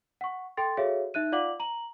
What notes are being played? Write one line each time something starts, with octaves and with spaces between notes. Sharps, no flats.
F#5 C#6
A4 G5 C6 A6
F#4 G#4 A4 C#5 E5 F5
D#4 E5 F#6 D#7
F4 D5 F5 F#5 D6 F#7
A#5 F#7